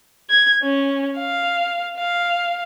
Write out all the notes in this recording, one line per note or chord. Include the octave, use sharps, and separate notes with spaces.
G#6
C#4
F5
F5